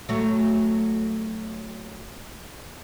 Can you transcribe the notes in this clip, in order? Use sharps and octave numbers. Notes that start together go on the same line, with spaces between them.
F#3 A3